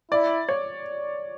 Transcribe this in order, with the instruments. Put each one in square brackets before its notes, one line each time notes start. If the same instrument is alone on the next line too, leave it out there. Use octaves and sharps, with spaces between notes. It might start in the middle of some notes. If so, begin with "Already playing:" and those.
[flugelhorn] E4 [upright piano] D5
[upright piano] C#5